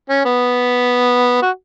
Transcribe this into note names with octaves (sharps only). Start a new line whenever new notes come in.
C#4
B3
F#4